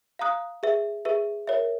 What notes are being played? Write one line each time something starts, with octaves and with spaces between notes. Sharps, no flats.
F5 A#5 D#6 F#6
G#4 B4 E5
G#4 B4 E5
A#4 C#5 E5